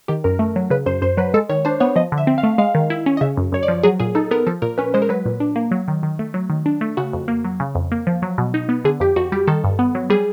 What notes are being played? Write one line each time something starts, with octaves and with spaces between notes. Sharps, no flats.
D#3 G4
F#2 A#4
A3
F#3
C#3 B4
F#2 C5
F#2 C5
F#3 B4
G#3 A4
D#3 C#5
D4 C5
B3 C#5
F3 D#5
D3
E5
C4
F5
A3
G#3 F5
D#3
E4
C#4
D#5
C#3 E5
F#2
F#2 C#5
D5
F3
F#3 G#4
A#2 G#4
D#4 A4
B3 A#4
F3 A4
A#2 A#4
C#4 B4
G#3 C5
A#4
F#3 B4
A#2
D4
A#3
F#3
D#3
D#3
A3
F#3
D#3
D4
A3
C#3 F#4
F2
A#3
F#3
C#3
F2
A#3
F3
F#3
B2
D#4
B3
D3 G#4
F2 G4
F2 F#4
G3 G4
D#3 A4
G2
B3
F#3
G3 G#4